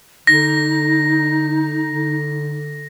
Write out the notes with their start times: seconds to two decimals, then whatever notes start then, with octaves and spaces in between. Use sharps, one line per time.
0.27 D3 D#4 A#6
1.88 D3